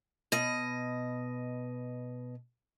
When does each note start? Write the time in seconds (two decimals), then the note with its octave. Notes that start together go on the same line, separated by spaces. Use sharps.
0.32 B2 D#5